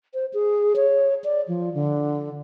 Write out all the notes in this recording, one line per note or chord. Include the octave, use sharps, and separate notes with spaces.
C5
G#4
C#5
D5
F3
D3